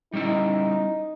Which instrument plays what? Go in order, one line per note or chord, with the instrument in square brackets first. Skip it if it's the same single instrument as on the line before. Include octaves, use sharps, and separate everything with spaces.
[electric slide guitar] G3 C#4 E4 [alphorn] D#4